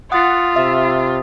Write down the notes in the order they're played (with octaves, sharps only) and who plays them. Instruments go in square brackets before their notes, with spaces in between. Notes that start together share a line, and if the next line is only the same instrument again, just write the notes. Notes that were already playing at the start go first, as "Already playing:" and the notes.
[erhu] F4 [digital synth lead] F#5 [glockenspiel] D#6 A6 B6
[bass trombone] C3 [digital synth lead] E5